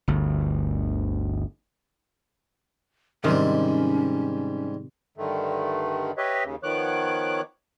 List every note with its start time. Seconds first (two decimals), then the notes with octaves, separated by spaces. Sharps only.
0.08 G1 D2
3.24 G#2 C3 D#3 G3 C#4 D#4
5.18 G2 D3 D#3 A3
6.18 G4 B4 C#5 D#5 E5
6.44 D#2 C#3
6.63 D#3 F3 B3 C#5 D6 F#6